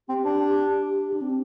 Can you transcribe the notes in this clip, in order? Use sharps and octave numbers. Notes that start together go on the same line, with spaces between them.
C4 G4
D4
D4
C4